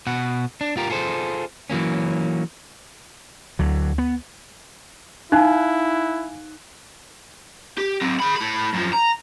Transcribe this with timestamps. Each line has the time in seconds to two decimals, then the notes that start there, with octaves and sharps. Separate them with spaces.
0.07 B2 F#5
0.61 D4
0.77 F4 G4 A#4
0.90 F4 G#4 A4 C5
1.70 E3 F#3 A#3 C#4
3.59 D2 D3 F#3
3.98 B3
5.32 D#4 E4 F5 G#5 F#6
7.78 G4
8.01 F#3 C4
8.20 G#4 B5
8.36 A2 B5
8.73 F#2 F3
8.93 A#5